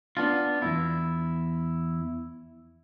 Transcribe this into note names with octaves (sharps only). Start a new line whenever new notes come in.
B3 D4 F4
E2 G#2 E4